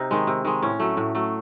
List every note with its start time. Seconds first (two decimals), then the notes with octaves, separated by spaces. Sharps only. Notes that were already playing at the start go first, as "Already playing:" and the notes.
Already playing: C3 D#4
0.11 D#3 G#3
0.27 C3
0.45 D#3 G#3
0.62 A2 C#4
0.80 F#3 A3
0.97 A2
1.15 F#3 A3